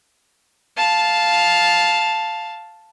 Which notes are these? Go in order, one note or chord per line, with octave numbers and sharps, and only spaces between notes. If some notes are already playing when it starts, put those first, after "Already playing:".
F5 A5